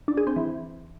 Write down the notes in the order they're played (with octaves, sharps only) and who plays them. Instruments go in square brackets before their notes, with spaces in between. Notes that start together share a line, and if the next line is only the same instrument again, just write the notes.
[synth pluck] D4
G#4
C4
E3